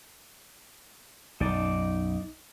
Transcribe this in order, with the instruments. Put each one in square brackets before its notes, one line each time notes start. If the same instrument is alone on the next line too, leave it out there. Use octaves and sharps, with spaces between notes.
[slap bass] B1 F#2 [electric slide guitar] D#4 D5